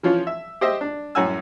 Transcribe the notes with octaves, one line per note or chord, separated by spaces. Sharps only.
E3 F3 C#4 F4
E5
G4 C5 D#5 E5
D4
F#2 A2 C#4 F#5 G#5 E6